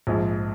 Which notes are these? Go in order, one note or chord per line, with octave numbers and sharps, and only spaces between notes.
A#1 G#2 F3 G#3